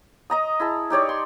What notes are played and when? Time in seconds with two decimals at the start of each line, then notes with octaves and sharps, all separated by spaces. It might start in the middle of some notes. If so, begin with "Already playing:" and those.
0.30 D#5 A#5 D#6
0.60 E4 G#4 A5
0.90 D#4 G4 C#5 D5
1.09 C6